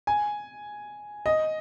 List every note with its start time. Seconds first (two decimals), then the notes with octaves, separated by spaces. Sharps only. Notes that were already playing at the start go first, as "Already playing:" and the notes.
0.07 G#5
1.26 D#5